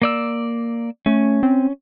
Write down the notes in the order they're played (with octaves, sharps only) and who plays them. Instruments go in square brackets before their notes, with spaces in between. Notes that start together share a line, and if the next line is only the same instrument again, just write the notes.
[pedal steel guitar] A#3 D5 E6
[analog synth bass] A3 [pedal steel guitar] C#4
[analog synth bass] C4